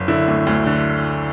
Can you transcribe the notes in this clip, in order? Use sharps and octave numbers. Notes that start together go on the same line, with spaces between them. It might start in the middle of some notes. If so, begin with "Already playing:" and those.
Already playing: F#1
D3 E4
D2
D2
D3